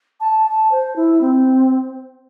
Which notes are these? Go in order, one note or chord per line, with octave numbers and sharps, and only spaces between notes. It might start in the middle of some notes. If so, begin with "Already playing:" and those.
A5
A5
C5
E4
C4